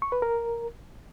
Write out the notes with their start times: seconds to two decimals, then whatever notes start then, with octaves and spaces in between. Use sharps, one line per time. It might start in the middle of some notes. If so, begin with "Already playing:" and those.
0.02 C#6
0.12 B4
0.22 A#4